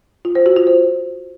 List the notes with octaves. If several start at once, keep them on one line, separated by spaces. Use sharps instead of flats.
F4
C5
F#4
F4
C5